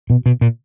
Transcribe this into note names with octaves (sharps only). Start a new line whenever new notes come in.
B2
B2
A#2